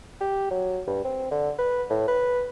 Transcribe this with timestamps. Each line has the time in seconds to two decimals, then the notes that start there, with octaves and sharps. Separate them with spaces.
0.21 G4
0.51 F#3
0.87 G2
1.05 C4
1.31 D3
1.59 B4
1.90 A2
2.08 B4